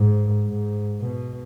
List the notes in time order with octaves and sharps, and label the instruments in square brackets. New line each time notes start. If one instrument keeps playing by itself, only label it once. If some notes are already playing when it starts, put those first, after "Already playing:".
Already playing: [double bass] G#2
G#2
B2